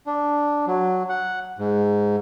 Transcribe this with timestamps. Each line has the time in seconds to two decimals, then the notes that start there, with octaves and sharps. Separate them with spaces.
0.07 D4
0.67 F#3
1.09 F#5
1.58 G#2